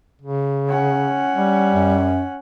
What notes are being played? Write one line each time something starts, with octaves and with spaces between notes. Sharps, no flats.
C#3
C#4 F#5
G3
F#2